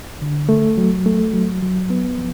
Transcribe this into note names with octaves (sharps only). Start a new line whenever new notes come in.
D3
A3
F#3
A3
F#3
F#3
B3
F3